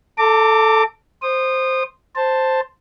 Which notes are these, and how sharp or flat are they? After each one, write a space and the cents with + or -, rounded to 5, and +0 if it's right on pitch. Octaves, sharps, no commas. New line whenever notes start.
A4 +0 A#5 -45 D6 +0
C5 +0 D#6 -20
C5 +0 A5 +5